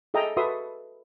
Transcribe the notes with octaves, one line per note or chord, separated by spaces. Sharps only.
G#4 A4 D#5 E5 G5 A#5
F#4 A4 B4 E5 C6 D#6